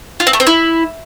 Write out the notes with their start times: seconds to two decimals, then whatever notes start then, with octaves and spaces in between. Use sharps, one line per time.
0.20 F4
0.27 C4
0.33 A3
0.40 C4
0.47 E4